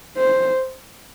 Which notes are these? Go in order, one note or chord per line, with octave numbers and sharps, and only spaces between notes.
C5